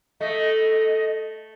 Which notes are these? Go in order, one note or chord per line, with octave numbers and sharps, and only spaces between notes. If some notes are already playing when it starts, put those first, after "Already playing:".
A3 D#5